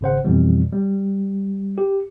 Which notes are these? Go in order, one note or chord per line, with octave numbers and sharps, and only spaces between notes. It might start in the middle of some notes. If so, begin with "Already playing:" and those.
G#1 C#3 C5 F#5
F2 B2 E3 G3
G3
G4